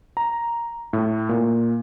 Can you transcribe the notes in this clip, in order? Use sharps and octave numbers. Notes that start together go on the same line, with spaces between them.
A#5
A2
A#2